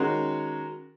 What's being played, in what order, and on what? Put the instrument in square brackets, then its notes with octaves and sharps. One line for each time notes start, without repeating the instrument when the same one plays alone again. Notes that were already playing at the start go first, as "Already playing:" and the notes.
Already playing: [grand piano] D#3 G#3 C#4 F#4 A#4